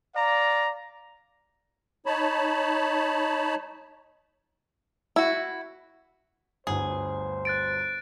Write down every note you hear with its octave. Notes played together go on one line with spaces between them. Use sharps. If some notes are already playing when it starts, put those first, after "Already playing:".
D5 F5 A#5
D#4 C#5 A5 B5
E4 F#4
G1 D2 G2 G#4 C5
F#6 A6 D7